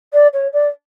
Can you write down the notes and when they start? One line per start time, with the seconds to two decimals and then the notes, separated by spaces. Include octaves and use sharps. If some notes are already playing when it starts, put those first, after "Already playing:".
0.13 D5
0.33 C#5
0.53 D5